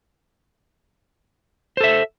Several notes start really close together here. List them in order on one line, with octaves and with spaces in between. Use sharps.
C5 A4 E5